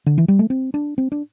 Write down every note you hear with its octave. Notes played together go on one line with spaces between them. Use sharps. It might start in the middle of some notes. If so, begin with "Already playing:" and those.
D3
E3
G3
A3
C4
D4
C4
D4